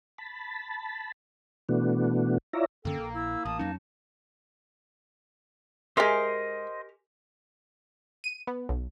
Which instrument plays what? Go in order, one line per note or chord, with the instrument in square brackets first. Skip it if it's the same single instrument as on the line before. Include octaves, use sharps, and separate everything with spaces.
[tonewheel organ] A5 B5
B2 E3 A3 B3 D4 F#4
E4 F4 C#5 D5 E5 A#5
[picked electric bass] F#2 D3 C#4 [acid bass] A#3 [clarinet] A4 [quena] G5
[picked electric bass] A#1
[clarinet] E4 [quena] E6
[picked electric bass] A1 [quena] A5 [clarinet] D#6
[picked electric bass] F2 F#3 C#4 [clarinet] D#4
[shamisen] G#3 E5 [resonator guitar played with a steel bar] G4 A#4 G#5 [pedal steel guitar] C5 D#5 C6
[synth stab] D#7
B3
B1